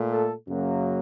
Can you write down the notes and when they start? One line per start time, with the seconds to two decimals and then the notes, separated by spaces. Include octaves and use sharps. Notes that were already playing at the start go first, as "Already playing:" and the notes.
Already playing: A#2 A3
0.11 A4
0.47 F#2 C#3 F#3 A#3